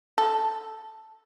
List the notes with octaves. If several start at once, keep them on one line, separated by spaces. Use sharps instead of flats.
A4